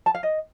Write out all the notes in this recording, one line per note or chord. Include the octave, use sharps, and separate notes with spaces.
A5
F5
D#5